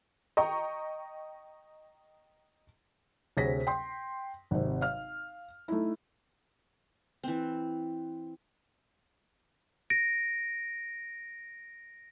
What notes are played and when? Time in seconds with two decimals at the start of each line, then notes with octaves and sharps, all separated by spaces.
0.37 D#5 G5 A#5 C#6
3.37 D2 C3 G#4 C#5 A#6 B6
3.67 G5 C6
4.51 G#1 C3
4.81 F5 F6
5.68 A3 D#4 E4
7.24 E3 C4
9.90 A#6 D7